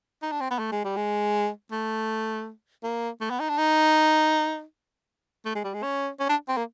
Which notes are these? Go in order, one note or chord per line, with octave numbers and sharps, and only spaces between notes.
D#4
D4
C4
B3
A3
G#3
G3
G#3
A3
A#3
A3
B3
D#4
D4
D#4
A3
G#3
G3
G#3
C#4
C#4
D4
C4
A#3